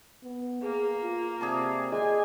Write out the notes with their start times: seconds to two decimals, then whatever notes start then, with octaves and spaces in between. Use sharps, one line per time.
0.24 B3
0.62 A#3 G#4
1.03 F4
1.41 C3 G#4 D5 A5
1.92 G#3 G#5